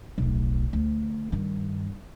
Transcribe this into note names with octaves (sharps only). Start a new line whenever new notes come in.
D1 B1
D2
G2 D#3